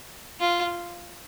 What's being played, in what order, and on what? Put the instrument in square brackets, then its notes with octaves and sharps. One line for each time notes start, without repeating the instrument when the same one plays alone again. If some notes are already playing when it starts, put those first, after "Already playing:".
[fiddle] F4